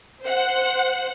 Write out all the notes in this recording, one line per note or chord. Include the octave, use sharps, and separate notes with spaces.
C5 F#5